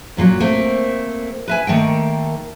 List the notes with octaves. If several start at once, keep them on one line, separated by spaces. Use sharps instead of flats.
F#2 A#2 F3 F#3
A3 A#3 C4
B4 E5 G#5
D#3 A3 A#3 G5